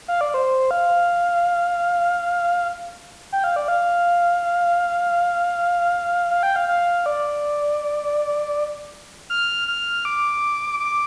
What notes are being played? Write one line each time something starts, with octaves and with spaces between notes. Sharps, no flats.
F5
D5
C5
F5
G5
F5
D5
F5
F5
G5
F5
F5
D5
F6
F6
D6
D6